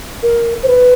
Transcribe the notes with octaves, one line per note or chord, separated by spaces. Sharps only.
A#4
C5
B4